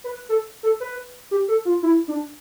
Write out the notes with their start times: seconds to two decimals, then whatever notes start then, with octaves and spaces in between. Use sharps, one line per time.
0.04 B4
0.29 A4
0.63 A4
0.80 B4
1.31 G4
1.48 A4
1.65 F4
1.83 E4
2.08 D4